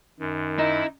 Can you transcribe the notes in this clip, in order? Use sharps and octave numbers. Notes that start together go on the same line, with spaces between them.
F#2 D#3
D#4 E4